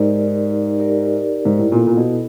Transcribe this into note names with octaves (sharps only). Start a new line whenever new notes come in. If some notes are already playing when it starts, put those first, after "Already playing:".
Already playing: G#2 D#4 G4 A#4 D5
D#4 G4 A#4 D5
G#2
A2
A#2 B3 E4 A4
A#2
B2